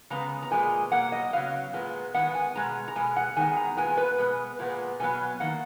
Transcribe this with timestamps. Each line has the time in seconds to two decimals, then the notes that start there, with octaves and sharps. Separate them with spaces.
0.10 C#3 G#3 B3 A#5
0.42 A#5
0.51 A#2 G#3 B3 G#5
0.92 B2 F#3 A#3 F#5
1.12 D#5
1.33 C#3 F#3 B3 F5
1.73 A#2 G#3 B3
2.14 D#3 G#3 B3 F#5
2.35 G#5
2.55 B2 G#3 B3 A#5
2.88 A#5
2.96 B2 G#3 B3 G#5
3.16 F#5
3.36 D#3 G#3 B3 G#5
3.48 G#5
3.57 A#5
3.77 A#2 G#3 B3 G#5
3.97 B4
4.18 B2 G#3 B3
4.59 A#2 G#3 B3
5.00 B2 F#3 B3 G#5
5.40 D#3 A#3 F#5